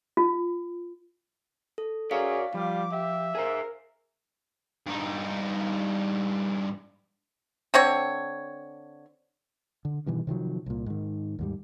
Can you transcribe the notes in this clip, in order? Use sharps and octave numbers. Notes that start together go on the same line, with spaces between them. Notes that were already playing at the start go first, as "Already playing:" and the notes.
F4
A4
F#4 G#4 A#4 C#5 D5 F5
F3 G3 F4 D6
G4 E5
G#4 A#4 C5
G2 D#4
D3 C4 C#5
D3
G2 B2 D#3 E3
C3 D#3 F3 F#3
C2 A#2
G#2 D#3
D#2 G#2 G3